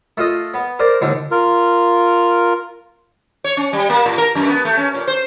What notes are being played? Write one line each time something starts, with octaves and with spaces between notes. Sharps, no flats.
A3 F4 D#5
B3
A#4 C5 D5
D#2 G#2 D3
F4 A#4
C#5
C#4
G3
A#3
A2
A#4
F#2
B3
A3
C#4
A#2
C5